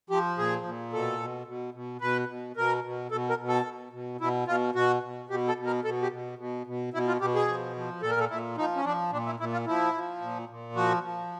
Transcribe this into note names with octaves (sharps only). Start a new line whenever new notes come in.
F3 G4
A#2 G#4
A#2
B2 A4
B2
B2
B2
B2 B4
B2
B2 A#4
B2
B2 A4
A#4
B2
A4
B2
B2
B2 E4
B2 F4
B2 F#4
B2
B2 G4
A4
B2
A#4
B2 A4
G4
B2
B2
B2
B2 E4
F4
B2 G4
G#4
F3
F3
A#2 A4
A#4
A4
A#2 E4
F3 D#4
C#4
F3 D4
A#2 D4
E4
A#2 E4
F4
F3 E4
F3
A#2
A#2
F3 F#4
F3